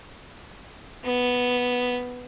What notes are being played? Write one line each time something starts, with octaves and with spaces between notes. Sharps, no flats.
B3